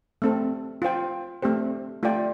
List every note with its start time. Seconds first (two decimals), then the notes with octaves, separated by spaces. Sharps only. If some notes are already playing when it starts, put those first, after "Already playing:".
0.22 A3 C4 A4
0.82 F4 C5 G5
1.43 A3 C4 G4 C5
2.03 A3 F4 D5 G5